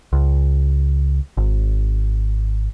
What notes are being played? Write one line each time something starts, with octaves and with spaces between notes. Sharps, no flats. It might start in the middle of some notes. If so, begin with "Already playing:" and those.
C#2
G#1